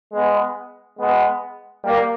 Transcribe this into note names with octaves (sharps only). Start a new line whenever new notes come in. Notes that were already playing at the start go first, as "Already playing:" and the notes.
G#3 B3
G#3 B3
G3 A#3